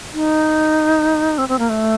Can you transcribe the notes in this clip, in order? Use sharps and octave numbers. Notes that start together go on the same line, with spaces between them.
D#4
C4
C4
A#3
A3